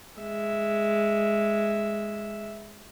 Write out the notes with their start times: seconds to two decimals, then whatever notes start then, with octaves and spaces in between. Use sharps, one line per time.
0.21 G#3 E5